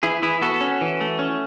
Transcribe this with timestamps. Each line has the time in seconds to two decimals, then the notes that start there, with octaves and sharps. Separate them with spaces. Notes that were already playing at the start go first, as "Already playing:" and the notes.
0.03 E3 E4 G#4
0.22 E3 E4 G#4
0.41 B3 F#4 A4
0.61 C#4
0.81 E3
1.01 A3
1.19 C#4